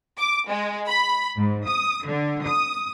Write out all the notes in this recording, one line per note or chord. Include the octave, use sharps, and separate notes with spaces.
D6
G#3
B5
G#2
D#6
D3
D#6